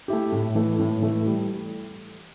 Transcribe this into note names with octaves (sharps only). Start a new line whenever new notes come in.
A3 E4 G4
A2
E3 A3
A2
E3 A3
G3